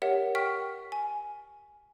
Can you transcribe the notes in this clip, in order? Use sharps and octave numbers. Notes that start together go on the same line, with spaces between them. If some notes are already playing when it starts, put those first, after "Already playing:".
G4 A#4 C#5 E5 F#5
G5 C#6 F6 B6
G#5